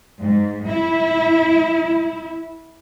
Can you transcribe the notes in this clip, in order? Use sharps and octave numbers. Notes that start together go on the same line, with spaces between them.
G#2
E4